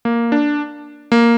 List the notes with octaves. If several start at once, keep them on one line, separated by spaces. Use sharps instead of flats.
A#3
D4
A#3